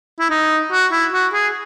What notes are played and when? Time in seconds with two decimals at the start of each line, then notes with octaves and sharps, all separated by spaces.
0.20 E4
0.30 D#4
0.72 F#4
0.92 E4
1.13 F#4
1.33 G#4